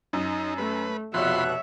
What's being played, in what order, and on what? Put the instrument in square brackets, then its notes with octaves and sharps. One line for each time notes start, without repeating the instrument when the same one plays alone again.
[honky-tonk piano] F#2 [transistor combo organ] D#4
[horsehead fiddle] A3 [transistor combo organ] B4
[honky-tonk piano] F1 [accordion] B2 F#6 [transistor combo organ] F3 B5 C6 [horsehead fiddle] C#5 E5